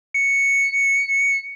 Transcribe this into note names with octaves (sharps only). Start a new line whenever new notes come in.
C#7